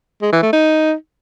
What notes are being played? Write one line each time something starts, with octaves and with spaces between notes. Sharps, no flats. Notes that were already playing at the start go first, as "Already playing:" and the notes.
G#3
E3
A3
D#4